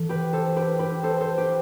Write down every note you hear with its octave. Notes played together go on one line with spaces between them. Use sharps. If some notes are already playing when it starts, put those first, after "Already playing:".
Already playing: E3 A4
G4 B4
A4 C5
G4 B4
G4 B4
A4 C5
A4 C5
G4 B4